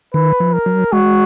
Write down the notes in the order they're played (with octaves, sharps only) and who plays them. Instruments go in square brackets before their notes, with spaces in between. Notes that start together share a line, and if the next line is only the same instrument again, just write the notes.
[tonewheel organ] D#3 [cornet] B4
[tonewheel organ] F3
[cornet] A#4
[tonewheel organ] F#3
[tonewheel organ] G#3 [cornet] F#4